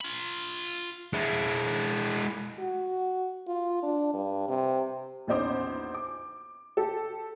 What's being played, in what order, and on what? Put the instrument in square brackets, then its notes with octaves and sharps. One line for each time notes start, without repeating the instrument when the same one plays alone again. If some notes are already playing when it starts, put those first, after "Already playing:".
[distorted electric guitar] F4 B5
G#3 E4
[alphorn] F#4
F4
D4
G2
C3
[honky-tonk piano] A#1 E2 C#4 D#4 C5 D6
D6
G4 A4